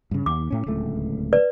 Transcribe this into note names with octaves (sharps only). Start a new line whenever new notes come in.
G2 C#3
D#2 D6
A2 C#4
D1 C#2 A3
B4 D5